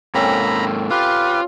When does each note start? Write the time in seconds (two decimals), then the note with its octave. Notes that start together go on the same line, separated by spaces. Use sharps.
0.15 G#2 A#3 C4 C#4 A4 A#5 B5
0.91 F4 G4 B4